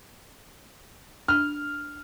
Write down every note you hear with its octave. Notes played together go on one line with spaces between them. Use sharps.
D4 F6